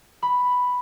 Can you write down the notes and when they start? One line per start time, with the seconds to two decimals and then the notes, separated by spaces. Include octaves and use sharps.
0.22 B5